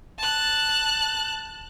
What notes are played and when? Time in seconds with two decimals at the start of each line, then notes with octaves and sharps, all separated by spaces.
0.18 A5 F#6